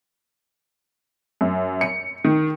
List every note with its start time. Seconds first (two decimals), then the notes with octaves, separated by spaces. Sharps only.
1.41 F#2
1.81 C#7
2.24 D#3